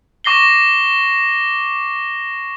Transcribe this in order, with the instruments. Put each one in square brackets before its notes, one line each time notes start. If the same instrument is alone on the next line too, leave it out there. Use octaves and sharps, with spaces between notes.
[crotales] C#6 D6 A#6 C7 G7